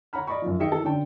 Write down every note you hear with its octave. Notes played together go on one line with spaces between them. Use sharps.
C#5 F#5 A#5 B5 F6
D5 D#5 B5 C#6
F#2 F3
D#3 G#4 D#5 E5 G5 C#7
E3 A4
D3 C#4 D5 G5 A5